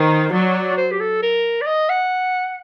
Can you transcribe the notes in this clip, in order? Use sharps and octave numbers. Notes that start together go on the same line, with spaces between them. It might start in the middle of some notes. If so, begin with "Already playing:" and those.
Already playing: D#3 C5
F#3 D5
C5
G4
A4
A#4
D5
D#5
F#5